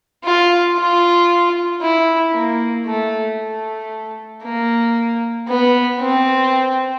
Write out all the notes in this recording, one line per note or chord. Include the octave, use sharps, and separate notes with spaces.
F4
F4
E4
A#3
A3
A3
A#3
B3
C4